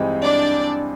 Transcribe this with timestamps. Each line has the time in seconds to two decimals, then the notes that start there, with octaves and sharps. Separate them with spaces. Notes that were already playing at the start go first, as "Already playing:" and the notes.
Already playing: G2 E3 G#3 C4 D#4
0.22 D4 D5